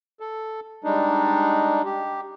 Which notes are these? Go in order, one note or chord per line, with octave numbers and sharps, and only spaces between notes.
A4
G3 G#3 D4 D#4
G4